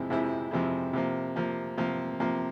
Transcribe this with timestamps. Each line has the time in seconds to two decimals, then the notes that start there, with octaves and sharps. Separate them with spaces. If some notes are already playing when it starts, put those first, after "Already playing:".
Already playing: F2 C3 F3 G#3 E4
0.10 F2 C3 F3 G#3 E4
0.51 F2 C3 F3 G#3 E4
0.93 C3 F3 A#3
1.36 C3 F3 A#3
1.77 C3 F3 A#3
2.20 C3 F3 A#3